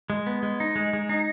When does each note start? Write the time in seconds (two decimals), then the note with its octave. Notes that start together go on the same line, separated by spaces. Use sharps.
0.10 G#3
0.27 B3
0.43 G#3
0.60 D#4
0.76 G#3
0.93 G#3
1.09 D#4